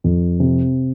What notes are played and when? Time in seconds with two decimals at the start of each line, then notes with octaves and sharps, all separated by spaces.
0.04 F2
0.40 C3